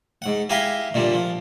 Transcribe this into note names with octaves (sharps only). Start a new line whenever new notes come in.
G#2 F#5
E4 G4 F5 G#5 A#5 C6
A#2 D3 G3
F3